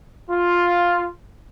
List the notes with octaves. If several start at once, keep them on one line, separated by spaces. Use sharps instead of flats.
F4